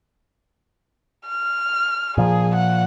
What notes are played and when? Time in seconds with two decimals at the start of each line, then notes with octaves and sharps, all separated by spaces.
1.28 F6
2.18 A#2 F3 G#4
2.55 F#5